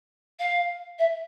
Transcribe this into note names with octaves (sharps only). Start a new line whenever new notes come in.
F5
E5